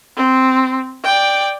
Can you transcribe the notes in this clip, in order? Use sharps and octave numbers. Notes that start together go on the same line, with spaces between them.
C4
D5 G5